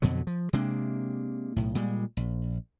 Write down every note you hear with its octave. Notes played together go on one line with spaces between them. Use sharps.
F2 B2 D3 F#3
F3
C3 G#3 A#3 D4
B1 A2
A#2 G3 G#3
A#1